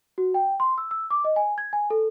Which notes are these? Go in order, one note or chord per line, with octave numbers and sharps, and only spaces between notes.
F#4
G5
C6
E6
E6
D6
D#5
G#5
G#6
G#5
A4